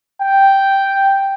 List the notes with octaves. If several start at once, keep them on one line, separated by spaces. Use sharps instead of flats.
G5